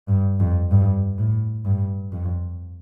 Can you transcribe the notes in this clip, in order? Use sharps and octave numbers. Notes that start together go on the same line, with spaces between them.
G2
F2
G2
A2
G2
F2